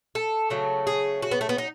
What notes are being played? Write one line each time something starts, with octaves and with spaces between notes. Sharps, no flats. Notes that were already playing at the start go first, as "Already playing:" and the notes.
A4
C#3 F#3 A3
G#4
F#4
B3
A3
B3
D#4